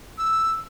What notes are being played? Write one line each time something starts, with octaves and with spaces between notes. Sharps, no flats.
E6